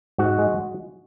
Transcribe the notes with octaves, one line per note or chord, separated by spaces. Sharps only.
G#2 F#4
G#3